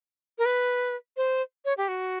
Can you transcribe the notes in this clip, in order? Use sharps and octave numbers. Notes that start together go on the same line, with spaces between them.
A#4
B4
C5
C#5
G4
F#4